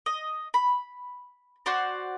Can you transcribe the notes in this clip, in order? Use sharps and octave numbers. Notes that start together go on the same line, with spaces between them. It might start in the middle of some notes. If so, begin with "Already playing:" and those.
D#5
B5
F#4 C5 D5